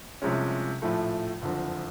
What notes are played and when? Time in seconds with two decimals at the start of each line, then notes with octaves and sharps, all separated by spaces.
0.22 C2 C3 F3 G#3 C#4
0.82 A#1 A2 F3 A3
1.42 F#1 F2 D3 F3